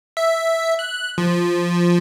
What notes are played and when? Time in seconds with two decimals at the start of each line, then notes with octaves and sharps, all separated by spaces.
0.17 E5
0.79 F#6
1.18 F3